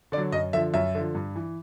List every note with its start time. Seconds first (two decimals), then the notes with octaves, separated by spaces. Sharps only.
0.12 D3 D5
0.17 F#3
0.32 F#2 D#5
0.53 D3 F3 E5
0.74 F#2 E5
0.95 D3 F3
1.15 G2
1.36 E3